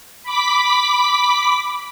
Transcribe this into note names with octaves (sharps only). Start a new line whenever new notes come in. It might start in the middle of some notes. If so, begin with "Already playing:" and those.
B5 D6 B6